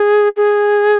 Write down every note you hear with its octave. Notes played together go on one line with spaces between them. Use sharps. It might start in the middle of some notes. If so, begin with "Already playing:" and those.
Already playing: G#4
G#4